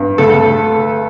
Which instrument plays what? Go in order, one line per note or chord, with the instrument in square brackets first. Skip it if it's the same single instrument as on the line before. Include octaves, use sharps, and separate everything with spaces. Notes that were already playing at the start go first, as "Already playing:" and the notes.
Already playing: [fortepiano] G2
D2 A4